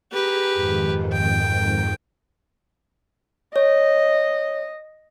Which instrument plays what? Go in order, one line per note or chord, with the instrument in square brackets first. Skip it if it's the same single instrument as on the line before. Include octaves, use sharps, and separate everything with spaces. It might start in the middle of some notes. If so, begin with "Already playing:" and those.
[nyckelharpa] G4 B4 [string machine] G#4 A#5
[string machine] F2 G#2 D#3
[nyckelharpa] G5
[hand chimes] C#5 [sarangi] D#5